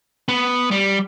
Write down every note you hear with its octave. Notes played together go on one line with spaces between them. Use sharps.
B3
G3